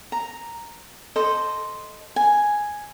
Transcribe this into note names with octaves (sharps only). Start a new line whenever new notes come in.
A#5
A4 C5 D#5
G#5